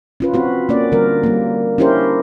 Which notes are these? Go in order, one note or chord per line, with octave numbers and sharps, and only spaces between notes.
C#4 F4 B4
C4 F#4 B4
A#3 C#4 D5
D3 G3 A#4
G3 A#3
C#4 D4 E4 G4 A#4 C5